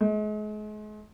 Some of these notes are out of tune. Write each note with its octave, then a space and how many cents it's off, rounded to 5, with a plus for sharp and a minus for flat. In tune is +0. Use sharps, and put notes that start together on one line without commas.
G#3 +40